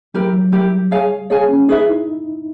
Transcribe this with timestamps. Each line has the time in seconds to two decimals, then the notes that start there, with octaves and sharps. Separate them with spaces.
0.14 F#3 E4 G4 A#4
0.33 F#3
0.52 G3 E4 G4 A#4
0.91 G#4 C#5 F5 G#5
1.30 A#3 G#4 C#5 F5 G#5
1.49 C#4
1.68 D#4 G#4 B4 E5
1.88 E4